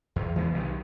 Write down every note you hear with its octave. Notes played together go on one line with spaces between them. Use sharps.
E2
E3 G#3 A3 B3
B1 C3 D#3